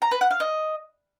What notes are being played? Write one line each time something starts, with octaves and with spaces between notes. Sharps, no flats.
A#5
B4
F#5
F5
D#5